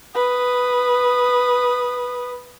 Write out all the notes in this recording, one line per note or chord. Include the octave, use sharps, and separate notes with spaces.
B4 D#6